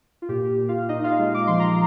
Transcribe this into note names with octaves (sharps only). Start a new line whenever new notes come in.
F4
A#2 G4
A#2
F4 F5
A#2 D#4 D#5
F4 F5
G#3
D6
F3 C6
A#5